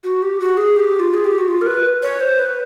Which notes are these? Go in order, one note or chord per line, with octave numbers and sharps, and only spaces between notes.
F#4
G4
F#4
G#4
G4
F4
G#4
G4
F#4
F4
A#4
B4
C#5
C5
B4